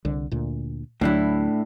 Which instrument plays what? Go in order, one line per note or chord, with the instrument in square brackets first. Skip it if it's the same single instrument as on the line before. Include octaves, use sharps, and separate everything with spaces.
[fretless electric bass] C2 D3
D2 A#2
[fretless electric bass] D2 F#3 [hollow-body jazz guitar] A2 D4 E4